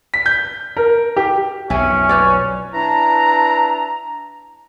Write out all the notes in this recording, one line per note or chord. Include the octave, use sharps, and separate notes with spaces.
B6
G6
A#4
G4
B1 F2 B2 C#4 E5 G#5
B4 C#5 D5
D4 E4 B4 A5 A#5